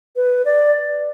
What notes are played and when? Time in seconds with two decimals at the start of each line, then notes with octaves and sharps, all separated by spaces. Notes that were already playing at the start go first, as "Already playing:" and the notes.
0.16 B4
0.45 D5